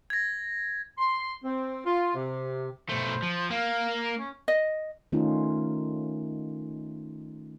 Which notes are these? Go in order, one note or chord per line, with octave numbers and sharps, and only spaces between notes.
G#6 A#6
C6
C4
F4
C3
B2 A3 C5
F3
A#3 F5
C#4
D#5
D#3 A3 C#4 D#4 F4